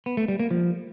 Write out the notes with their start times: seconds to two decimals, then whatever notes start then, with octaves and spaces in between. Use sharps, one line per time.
0.06 B3
0.17 A3
0.28 G3
0.40 A#3
0.51 F3